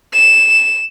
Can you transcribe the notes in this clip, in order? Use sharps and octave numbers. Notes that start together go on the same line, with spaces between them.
E7